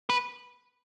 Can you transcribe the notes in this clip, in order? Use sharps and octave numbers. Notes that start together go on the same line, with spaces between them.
B4